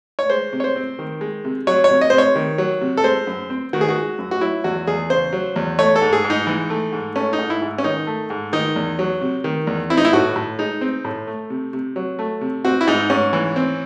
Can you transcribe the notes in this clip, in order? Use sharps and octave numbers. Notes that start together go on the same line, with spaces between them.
C#5
G#3 C5
C3
C#5
C5
C4
D#3
G#3
C3
F#3 C#5
C#5
C3
D#5
C3 C5
C#5
D#3
F#3
C3
A4
G#3 C5
F#2
C4
D#3 F#4
G#4
F#4
G#3
F#2
F#4
F#3 E4
E2 F#4
E2 G#4
C#3 C5
F#3
E2
A3 C#5
A4
G#2
G#4
G#2
D#4
E3
A3
G#2
A3 C#4
D#4
G#2
E4
G#2
C#4
D#3 D#4
A3
G#2
D#3 D#4
E2
F#3
C3
D#3
E2
C4 E4
D#4
E4
A2 F#4
A2
G#3 D#4
C4
A2
A3
C3
C3
F#3
A3
C3
C4 F#4
E4
G#2 D#4
G#2 C#4
E3
C4